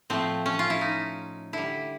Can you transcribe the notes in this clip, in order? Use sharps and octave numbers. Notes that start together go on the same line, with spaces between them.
A2 F3 A3 C4
C#4
F4
E4
D#4
D3 G3 E4